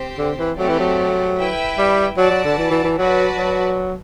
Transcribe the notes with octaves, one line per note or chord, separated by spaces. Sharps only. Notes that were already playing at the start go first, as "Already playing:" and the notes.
Already playing: C4 G4 C5
D3
E3
F#3 A3 C4 G4 D5
E3
F#3
E4 B4 E5 G5
G3
F#3 F#4 B4 D5 A5
F#3
D3
E3
E3
E3
F#3 F#4 B4 D5 A5
F#3